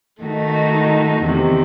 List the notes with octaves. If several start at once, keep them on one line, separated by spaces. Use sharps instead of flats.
D#3 A3 D#4 F#4
E2 C3 D#3